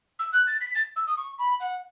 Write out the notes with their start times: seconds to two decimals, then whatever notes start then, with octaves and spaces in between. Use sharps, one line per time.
0.19 E6
0.32 F#6
0.47 A6
0.61 B6
0.75 A6
0.96 E6
1.07 D#6
1.17 C#6
1.38 B5
1.60 F#5